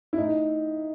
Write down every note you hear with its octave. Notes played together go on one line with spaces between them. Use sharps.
E4
A2 D#4